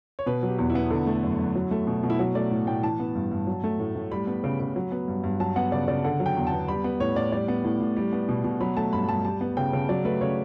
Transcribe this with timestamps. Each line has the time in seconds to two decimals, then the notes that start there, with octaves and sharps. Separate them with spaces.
0.19 C#5
0.26 B2 B4
0.43 F#3
0.49 G4
0.59 E2
0.70 E4
0.75 B3
0.90 D3
1.07 A3
1.24 F#2
1.39 F#2
1.55 F#3
1.71 A3
1.87 B2
2.03 B2
2.10 E4
2.19 F#3 F#4
2.35 A3 D5
2.51 A2
2.67 A2 G5
2.83 E3 A5
3.00 B3
3.15 G2
3.32 G2
3.47 F#3
3.64 A3
3.80 A2
3.96 A2
4.11 G3 B5
4.27 B3
4.44 C#3
4.60 C#3
4.76 F#3
4.92 B3
5.08 G2
5.24 G2
5.40 F#3 A5
5.56 B3 F#5
5.72 C#3 D5
5.88 C#3 D5
6.04 D3 F#5
6.20 F#3
6.26 G5
6.37 E2
6.47 A5
6.52 B3
6.68 G3 B5
6.84 B3
7.00 A2 C#5
7.16 A2 D5
7.32 G3 D5
7.48 B3
7.65 A2
7.80 A2
7.97 G3
8.13 B3
8.29 B2
8.44 B2
8.61 F#3 B5
8.77 A3 A5
8.93 G2 B5
9.09 G2 A5
9.25 G3 A5
9.41 B3
9.57 C#3 G5
9.73 C#3
9.89 F#3 D5
10.05 A3 B4
10.21 C#3 C#5